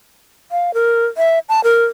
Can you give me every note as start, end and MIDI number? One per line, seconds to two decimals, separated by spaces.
0.51 0.74 77
0.74 1.06 70
1.17 1.39 76
1.49 1.64 81
1.64 1.83 70